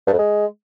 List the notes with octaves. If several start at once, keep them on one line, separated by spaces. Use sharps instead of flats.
G2
F2
G#3